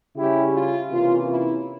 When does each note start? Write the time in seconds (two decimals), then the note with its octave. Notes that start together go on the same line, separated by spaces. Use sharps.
0.16 C#3 G3 C#4 E4 G4
0.54 F4
0.91 C3 E3 A#3 C#4 F4
1.28 E4